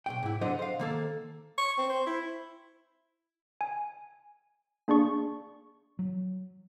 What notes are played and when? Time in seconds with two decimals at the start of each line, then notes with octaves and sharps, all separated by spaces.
0.06 B1 F2 G5
0.23 G#2 E4
0.41 D3 F#3 C5 D#5
0.59 C5 F5
0.79 D#3 A#3 A4
1.58 C#6
1.78 C4
1.90 C5
2.07 E4
3.61 G#5
4.88 A#3 D4 G#4 D5 C#6
5.99 F#3